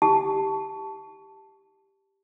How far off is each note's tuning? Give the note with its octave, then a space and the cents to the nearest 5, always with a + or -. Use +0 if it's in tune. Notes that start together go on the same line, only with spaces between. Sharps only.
G4 +0 A5 +0